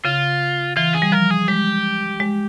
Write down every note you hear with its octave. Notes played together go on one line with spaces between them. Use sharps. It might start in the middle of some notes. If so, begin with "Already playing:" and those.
C#3 F4
E3 F4
G#4
G3
F3 A#4
G#4
G#3 G4
G#3